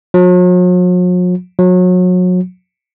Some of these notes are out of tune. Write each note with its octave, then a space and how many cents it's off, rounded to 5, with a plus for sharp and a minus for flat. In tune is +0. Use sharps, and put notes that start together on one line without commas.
F#3 -45
F#3 -30